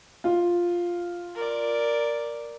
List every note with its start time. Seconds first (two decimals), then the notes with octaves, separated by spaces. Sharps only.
0.24 F4
1.35 A#4 D5